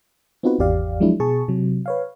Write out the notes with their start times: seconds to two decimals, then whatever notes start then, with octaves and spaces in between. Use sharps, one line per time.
0.43 B3 C4 D#4 F4 F#4 B4
0.59 G#1 E2 G4 D5 F5
1.00 F3 F#3 G#3 D4 E4
1.20 B2 G#4 A5 C#6
1.48 C3 F#3
1.86 B4 C#5 F5